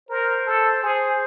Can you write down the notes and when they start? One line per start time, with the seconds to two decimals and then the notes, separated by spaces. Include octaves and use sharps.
0.09 A#4 C5
0.47 A4
0.82 G#4 C5